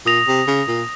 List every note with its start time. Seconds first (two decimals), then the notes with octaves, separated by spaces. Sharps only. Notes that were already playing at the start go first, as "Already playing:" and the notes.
0.06 A#2 D#6 A#6 F7
0.27 C3
0.48 C#3
0.68 A#2